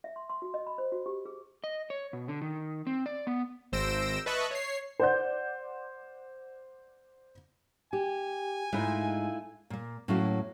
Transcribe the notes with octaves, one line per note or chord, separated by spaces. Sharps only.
E5
C6
C6
F#4
D#5
B5
C5
F#4
G4
G#4
D#5
C#5
B2
D3
D#3
C4
D5
B3
G#1 C5 E6 A#6 D7 E7
B4 D#5 E5 A5 C#6 F#6
C#5 C7
C5 D5 F#5 G6
G4 G#5
G#2 A3 E4 F4
A#2 A#3
A2 F#3 A#3 C#4 E4 F#4